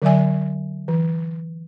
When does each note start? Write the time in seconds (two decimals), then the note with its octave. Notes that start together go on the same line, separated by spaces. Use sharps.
0.02 D3 F#3 D5 E5 G#5
0.88 E3